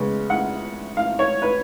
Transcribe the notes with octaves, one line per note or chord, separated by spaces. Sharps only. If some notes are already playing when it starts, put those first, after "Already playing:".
Already playing: C#3 G#3 B3
F#5
F5
C#5
B4